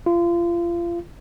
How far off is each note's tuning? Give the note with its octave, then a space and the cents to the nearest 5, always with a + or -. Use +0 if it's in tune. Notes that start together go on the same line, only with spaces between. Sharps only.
F4 -30